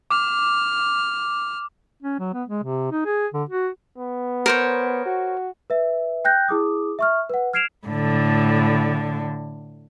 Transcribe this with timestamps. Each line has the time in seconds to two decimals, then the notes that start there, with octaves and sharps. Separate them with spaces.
0.11 D6 F6
2.03 C#4
2.19 F#3
2.34 B3
2.49 G#3
2.64 C3
2.91 D#4
3.05 G#4
3.34 D3
3.49 F#4
3.98 B3
4.46 A#4 C5 C#5
5.06 F#4
5.70 B4 E5
6.25 G5 F#6 G6 A#6
6.48 E4 G#4 D6 D#6
6.99 E5 C#6 F6
7.30 B4 F#5
7.53 F6 G#6 C7 D7 E7 F7
7.87 A2 D3